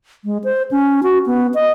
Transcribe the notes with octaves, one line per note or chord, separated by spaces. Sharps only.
G#3
C5
C#4
F#4
B3
D#5